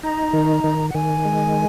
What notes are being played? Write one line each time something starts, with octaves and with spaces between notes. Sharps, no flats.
D#4 A#5
D#3
D#3
F#5
D#3 G#5
G#3